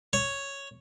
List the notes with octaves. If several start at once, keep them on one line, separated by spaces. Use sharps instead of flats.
C#5